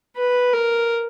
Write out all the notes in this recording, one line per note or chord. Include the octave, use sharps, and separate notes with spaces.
B4
A#4